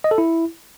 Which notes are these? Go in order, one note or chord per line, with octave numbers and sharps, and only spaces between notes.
D#5
A4
E4